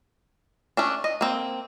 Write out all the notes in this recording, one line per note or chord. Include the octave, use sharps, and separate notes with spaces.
A3 C#4 D4
D#5
A#3 C4